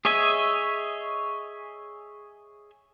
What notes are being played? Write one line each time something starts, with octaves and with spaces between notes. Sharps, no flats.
G#4 C#5 D#5 E5 G#5